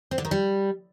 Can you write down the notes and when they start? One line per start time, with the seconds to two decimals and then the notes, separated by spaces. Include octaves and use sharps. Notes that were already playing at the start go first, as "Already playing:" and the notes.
0.11 C4
0.18 D3
0.25 D#3
0.31 G3